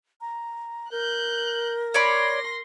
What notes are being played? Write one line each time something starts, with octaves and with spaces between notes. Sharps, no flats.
A#5
A#4 F#6 G6
C#5 D5 B5 C6 A#6